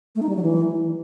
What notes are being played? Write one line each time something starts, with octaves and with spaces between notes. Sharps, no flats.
A3
D#4
G3
F#3
E3